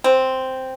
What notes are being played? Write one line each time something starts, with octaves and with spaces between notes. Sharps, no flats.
C4